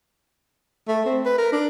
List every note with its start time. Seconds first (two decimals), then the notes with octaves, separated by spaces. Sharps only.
0.88 A3
1.06 C4
1.25 B4
1.38 A#4
1.52 D4